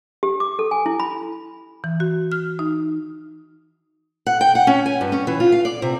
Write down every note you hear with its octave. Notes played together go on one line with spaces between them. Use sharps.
G4
D6
A4
G#5
E4
B5
E3
F#4
F6
D#4
F#5
G5
F#5
C#4
G#5
G2
C#4
E3
F4
F5
D5
C3